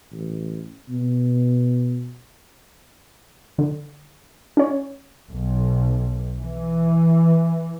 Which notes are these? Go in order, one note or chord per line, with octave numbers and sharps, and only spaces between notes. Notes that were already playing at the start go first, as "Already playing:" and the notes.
A1
B2
D3
C#4 C#5
B1
E3